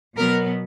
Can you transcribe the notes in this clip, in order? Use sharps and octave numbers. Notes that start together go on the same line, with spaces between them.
B2 F#3 B3 A#4